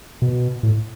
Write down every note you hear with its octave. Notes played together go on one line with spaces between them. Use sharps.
B2
A2